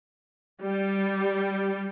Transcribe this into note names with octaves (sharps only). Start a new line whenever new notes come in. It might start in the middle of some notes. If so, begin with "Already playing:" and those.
G3